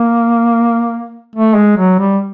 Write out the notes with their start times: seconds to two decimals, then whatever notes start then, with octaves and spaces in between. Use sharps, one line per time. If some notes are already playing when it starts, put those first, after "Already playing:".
Already playing: A#3
1.35 A3
1.56 G#3
1.77 F#3
1.99 G3